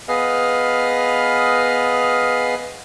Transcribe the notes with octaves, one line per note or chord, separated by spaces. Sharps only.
B3 G#4 B4 D#5 F5 F6